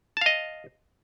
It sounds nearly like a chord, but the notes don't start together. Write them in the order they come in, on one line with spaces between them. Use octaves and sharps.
A5 F5 D#5